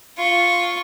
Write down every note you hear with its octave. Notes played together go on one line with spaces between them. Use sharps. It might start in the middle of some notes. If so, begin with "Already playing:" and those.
F4 C#6